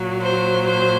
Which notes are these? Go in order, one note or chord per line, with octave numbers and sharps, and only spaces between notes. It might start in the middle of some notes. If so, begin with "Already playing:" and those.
Already playing: A#2 F#3
C5
C5